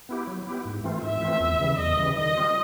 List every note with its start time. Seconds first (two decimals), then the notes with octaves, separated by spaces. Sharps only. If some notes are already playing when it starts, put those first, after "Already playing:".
0.09 B3 E4 G4
0.27 F#3
0.47 B3 E4 G4
0.65 G#2
0.84 E3 A3 C4 F4
1.02 G#2 E5
1.21 E3 A3 C4 F4
1.40 E2
1.59 C#3 E3 G3
1.78 E2 D#5
1.97 C#3 E3 G3
2.16 D#3 D#5
2.35 G3 C4 F4